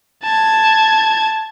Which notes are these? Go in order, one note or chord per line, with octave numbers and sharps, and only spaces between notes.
A5 G#6